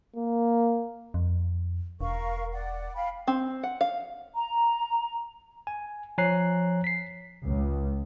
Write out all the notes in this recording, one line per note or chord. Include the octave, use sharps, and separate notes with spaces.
A#3
F2
E1 A#4 F5 C#6
D5 F#5
F5 G5 B5
C4
F#5
F5
A#5
G#5
F3 C#5 G#5 A#5 F#6 C7
B6 C7
C#2